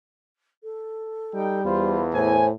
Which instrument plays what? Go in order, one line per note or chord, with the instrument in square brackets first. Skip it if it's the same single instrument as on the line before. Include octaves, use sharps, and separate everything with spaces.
[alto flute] A4
[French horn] G3 [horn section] D#4 G5
[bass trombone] E2 [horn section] F4 C5 [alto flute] B5
[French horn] A2 [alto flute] C5 [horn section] G#5